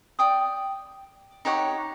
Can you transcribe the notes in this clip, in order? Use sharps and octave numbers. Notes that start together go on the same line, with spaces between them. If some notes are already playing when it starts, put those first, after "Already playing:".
D5 G5 D#6
D#4 G4 C#5 F#5